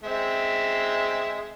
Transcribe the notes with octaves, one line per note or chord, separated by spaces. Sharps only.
G#3 C4 E5